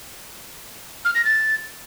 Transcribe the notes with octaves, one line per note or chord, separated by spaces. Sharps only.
F6
A#6
A6